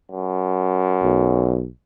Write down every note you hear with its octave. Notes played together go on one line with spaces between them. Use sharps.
F#2
B1